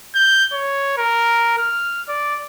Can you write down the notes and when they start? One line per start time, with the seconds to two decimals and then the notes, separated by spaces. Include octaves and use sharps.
0.15 G6
0.53 C#5
0.98 A#4
1.58 F6
2.08 D5